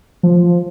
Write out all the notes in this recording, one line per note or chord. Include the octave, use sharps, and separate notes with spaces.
F3